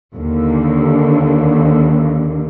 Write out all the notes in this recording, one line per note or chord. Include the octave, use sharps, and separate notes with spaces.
D#2 D3